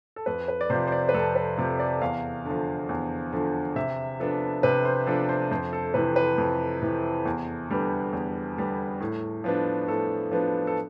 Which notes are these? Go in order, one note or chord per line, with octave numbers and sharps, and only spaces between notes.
A4
F2 B4
B4
D5
C3 F3 C5
C5
D5
B4
F2 A4
B4
C3 F3
D5
E2 F5
D3 F3
E2
D3 F3
C3 E5
F3 B3 D4 A4
C3 B4
C5
F3 B3 D4 A4
C5
F2 C5
A4
C3 E3 B4
B4
F2
C3 E3
E2
D3 G3 B3
E2
D3 G3 B3
A2
F3 B3 D4
A2 A4
F3 B3 D4
A4